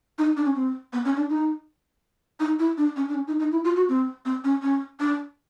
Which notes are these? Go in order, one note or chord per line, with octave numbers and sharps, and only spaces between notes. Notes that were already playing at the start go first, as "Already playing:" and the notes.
D#4
D4
C#4
C4
B3
C#4
D4
D#4
D#4
E4
D4
C#4
D4
C#4
D#4
D#4
E4
F4
F#4
C4
C4
C#4
C#4
D4